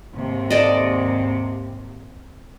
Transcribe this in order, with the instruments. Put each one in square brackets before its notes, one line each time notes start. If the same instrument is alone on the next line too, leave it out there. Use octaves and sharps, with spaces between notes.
[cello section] D#2 G#2 C3
[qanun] A4 D5 D#5